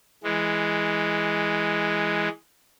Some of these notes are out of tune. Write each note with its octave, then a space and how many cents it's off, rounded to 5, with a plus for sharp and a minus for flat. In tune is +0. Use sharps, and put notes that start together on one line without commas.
E3 +0 G#3 +0